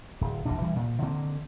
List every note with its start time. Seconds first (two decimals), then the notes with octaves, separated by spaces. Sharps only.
0.21 D1
0.46 E1 A#1 F#2 D4
0.62 E3 G3
0.76 A#2
1.02 D3 D#3 A#3 C4